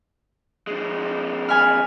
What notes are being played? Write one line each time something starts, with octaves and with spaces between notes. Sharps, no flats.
F2 G#3
G#5 B5 F6